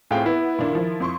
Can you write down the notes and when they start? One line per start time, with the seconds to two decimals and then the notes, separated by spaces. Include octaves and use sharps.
0.11 A2 C4 F4 G#4 F5 G5
0.26 B3 E4
0.59 A#2 D#3 D4
0.73 D#3 F3
1.00 F2 C6 C#6